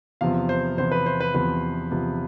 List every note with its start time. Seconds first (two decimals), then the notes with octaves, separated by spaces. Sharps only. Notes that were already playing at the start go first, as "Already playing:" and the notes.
0.21 E2 C3 F3 B3 F5
0.49 C5
0.77 E2 C3 F3 B3 C5
0.92 B4
1.06 C5
1.20 B4
1.34 E2 C3 F3 B3 B4
1.91 E2 C3 F3 B3